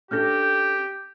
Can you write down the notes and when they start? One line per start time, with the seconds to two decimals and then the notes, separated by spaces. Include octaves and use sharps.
0.11 C#4 D4 G4 A4 F6 G6 A#6
0.43 G6